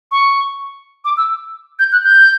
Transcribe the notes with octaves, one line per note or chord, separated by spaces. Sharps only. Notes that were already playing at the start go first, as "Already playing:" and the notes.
C#6
D6
E6
G6
F#6
G6